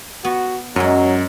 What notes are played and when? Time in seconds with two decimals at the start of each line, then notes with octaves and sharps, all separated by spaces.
0.25 B3 F#4
0.76 F#2 F#3 G#3 C#4